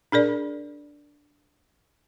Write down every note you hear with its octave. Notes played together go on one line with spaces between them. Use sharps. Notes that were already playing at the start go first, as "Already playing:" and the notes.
D4 G#4 A#4 D5